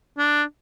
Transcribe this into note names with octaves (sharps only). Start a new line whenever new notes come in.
D4